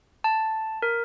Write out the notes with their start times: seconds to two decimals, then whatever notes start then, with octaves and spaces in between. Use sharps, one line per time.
0.24 A5
0.82 A#4